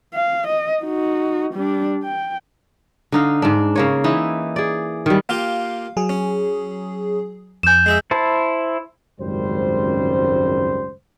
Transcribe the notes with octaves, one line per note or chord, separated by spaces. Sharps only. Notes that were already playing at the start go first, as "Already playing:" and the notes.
F5
D#5
D#4 F#4
G3 D4
G5
D3 D#4 F5
G#2 D4
C#3 A#3 C#5
E3 D#4 E4
G#4 D5
D#3 G3
A#3 F4 G4 F5
F#3 G#4
C#4
F2 G#5 G6 E7
G#3 G#4 E5
E4 C5 A5
G#1 C#2 F#2 G3 C5